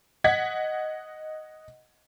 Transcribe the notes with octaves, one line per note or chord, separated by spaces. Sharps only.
D#5 F#5 G#6 B6